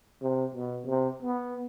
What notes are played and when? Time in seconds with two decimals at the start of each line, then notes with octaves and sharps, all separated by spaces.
0.21 C3
0.55 B2
0.86 C3
1.22 B3